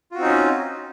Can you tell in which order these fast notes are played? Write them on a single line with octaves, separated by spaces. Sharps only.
F4 F#4 C4 D#4 C#4